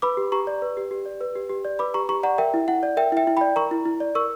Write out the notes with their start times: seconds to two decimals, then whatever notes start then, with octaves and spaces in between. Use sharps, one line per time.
0.02 B4 B5 D6
0.17 G4
0.32 G4 A#5 C#6
0.47 D5
0.62 B4
0.77 G4
0.91 G4
1.05 D5
1.21 B4
1.36 G4
1.49 G4
1.65 D5
1.79 B4 B5 D6
1.94 G4 A#5 C#6
2.09 G4 A#5 C#6
2.23 D5 F#5 A#5
2.38 A#4 E5 G5
2.54 E4
2.68 E4 F#5
2.83 D5
2.97 A#4 E5 G5
3.12 E4 E5 G5
3.27 E4
3.37 D5 G5 B5
3.56 A#4 A#5 C#6
3.71 E4
3.85 E4
4.00 D5
4.15 A#4 C#6 E6